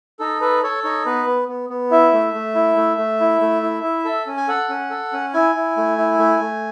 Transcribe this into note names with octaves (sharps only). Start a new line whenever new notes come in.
D#4 A4
A4 B4
A4 C#5
D#4 C#5
B3 B4
B3
B3
B3
E4 E5
A3
A3
E4
A3
A3
E4
A3
E4
E4
A4
C#4
G#5
A4 F#5
C#4
A4
C#4
E4 G#5
E4
A3
E4
A3
A3